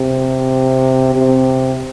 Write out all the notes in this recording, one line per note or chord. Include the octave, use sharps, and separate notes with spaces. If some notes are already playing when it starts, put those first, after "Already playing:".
Already playing: C3
C3